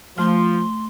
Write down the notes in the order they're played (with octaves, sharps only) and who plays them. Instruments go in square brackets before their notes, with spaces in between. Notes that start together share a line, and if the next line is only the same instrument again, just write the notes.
[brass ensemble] F3 [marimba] A3 F6 [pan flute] C6